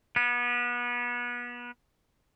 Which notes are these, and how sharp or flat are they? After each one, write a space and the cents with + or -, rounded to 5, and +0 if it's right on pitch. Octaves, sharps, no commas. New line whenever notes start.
B3 -30